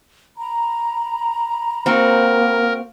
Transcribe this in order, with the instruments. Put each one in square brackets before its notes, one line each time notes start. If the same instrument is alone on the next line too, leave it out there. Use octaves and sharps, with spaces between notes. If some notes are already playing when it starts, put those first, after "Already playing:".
[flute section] A#5 B5
[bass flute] A#3 [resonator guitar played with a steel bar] C4 F#4 [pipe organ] A#4